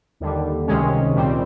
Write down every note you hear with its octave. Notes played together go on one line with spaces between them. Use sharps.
D#2 D3 G3
C#2 C3 D#3 G#3 C#4
A#2 G3 C4